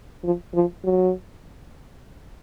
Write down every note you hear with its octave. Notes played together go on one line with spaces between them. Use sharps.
F3
F3
F#3